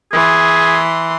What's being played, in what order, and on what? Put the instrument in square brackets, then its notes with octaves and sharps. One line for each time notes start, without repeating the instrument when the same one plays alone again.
[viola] E3 C6 [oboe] G#4